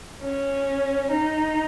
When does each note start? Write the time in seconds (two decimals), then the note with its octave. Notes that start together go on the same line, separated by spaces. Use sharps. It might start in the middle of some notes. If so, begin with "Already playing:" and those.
0.22 C#4
1.11 D#4